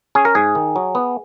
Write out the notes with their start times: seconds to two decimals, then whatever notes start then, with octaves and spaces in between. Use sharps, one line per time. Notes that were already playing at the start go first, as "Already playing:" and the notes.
0.15 C#4 G#4
0.25 A#4
0.35 G#2 G#4
0.55 D#3
0.76 F#3
0.95 B3